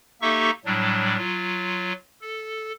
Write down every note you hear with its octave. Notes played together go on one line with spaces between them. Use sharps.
A#3 D#4 G4 A4 E5 C#6
A2 F#3 G3 D4
F#3 F4
A4